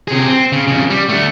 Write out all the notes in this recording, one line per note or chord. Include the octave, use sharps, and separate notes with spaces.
C3 G#4
C4
C#3
F2 C#3
G3
A3 D4